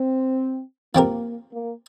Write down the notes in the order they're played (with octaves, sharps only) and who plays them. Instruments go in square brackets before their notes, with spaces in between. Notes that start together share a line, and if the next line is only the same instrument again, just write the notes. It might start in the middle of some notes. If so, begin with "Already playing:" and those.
Already playing: [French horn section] C4
[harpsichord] F3 C4 G4 A#4 [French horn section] A#3
[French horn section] A#3